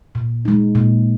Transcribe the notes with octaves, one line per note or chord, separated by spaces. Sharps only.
A#2
G#3 D#4
A#2